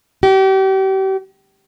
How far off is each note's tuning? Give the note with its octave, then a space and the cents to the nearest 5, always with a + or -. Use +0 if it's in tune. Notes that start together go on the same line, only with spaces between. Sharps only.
G4 -35